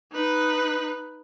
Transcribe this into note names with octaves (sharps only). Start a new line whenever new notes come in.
D#4 B4